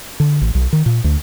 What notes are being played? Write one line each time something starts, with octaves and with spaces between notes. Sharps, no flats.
D3
A1
B1
D#3
A#2
D2